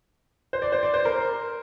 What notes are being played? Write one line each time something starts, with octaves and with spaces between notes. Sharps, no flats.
C5
D5
C5
D5
C5
A#4